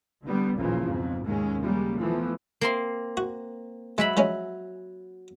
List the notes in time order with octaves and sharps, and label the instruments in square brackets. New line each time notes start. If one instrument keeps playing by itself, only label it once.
[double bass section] D3 G3 B3
A1 D#2 A#2 C#3 E3 F3
B1 F2 G#2
D#2 G#2 G#3 C#4
C#3 G3 G#3 A#3
E3 F3 A3 B3
[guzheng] A#3 C4 C6
[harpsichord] F#4
[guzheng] F#3 E5 B5 [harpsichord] G#3
[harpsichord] F3 G#3 C#4